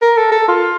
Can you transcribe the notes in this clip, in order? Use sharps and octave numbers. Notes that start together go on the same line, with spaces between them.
A#4
A4
A4
F4